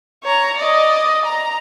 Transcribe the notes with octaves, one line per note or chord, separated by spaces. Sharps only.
C#5 A#5
D5 D#5
A#5